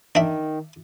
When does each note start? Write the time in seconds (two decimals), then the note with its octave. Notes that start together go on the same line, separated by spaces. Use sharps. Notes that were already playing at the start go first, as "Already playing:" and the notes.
0.15 D#3 D4 E5